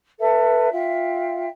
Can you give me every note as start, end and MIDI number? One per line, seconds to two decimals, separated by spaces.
0.19 0.70 69
0.19 0.70 71
0.19 0.70 76
0.72 1.47 65
0.72 1.47 76
0.72 1.47 79